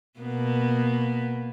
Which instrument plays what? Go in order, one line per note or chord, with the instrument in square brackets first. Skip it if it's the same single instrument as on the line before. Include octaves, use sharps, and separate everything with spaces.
[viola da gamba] B2 A#3 B3